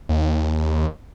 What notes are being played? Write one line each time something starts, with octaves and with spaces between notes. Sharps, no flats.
D#2